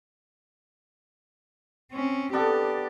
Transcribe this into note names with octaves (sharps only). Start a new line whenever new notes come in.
C4 C#4
B3 D4 G4 A4